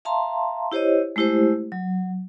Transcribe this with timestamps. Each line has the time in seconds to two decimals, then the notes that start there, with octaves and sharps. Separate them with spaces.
0.05 E5 F5 A5 A#5 C6
0.72 E4 G4 C5 C#5 D#5
1.16 G#3 A3 E4 G4 C5
1.72 F#3